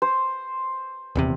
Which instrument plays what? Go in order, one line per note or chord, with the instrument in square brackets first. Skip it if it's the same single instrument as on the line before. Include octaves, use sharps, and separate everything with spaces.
[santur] C5
[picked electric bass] D#1 E2 C3